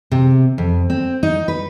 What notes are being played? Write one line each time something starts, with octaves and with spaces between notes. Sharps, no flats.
C3
F2
C4
D#4
B4